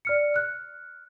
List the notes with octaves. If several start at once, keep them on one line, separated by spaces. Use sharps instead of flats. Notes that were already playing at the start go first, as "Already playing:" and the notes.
D5 F6 C#7
F6 F#6